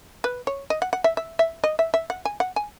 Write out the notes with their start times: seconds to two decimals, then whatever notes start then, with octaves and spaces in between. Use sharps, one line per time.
0.24 B4
0.47 C#5
0.70 D#5
0.82 F#5
0.93 F#5
1.04 E5
1.17 E5
1.39 E5
1.64 D#5
1.79 E5
1.94 E5
2.10 F#5
2.25 G#5
2.40 F#5
2.56 G#5